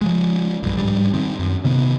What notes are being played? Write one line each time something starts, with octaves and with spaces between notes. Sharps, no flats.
F3 F#3 G#3
B1 G2
G#2 G3
D#3 C4
F#2
C3 D#3 B3